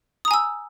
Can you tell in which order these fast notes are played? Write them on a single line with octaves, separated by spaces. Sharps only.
D#6 A#5 G#5 E6